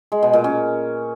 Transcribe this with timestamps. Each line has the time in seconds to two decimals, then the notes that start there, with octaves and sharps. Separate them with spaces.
0.12 G#3
0.23 B2
0.33 A#2
0.44 C#4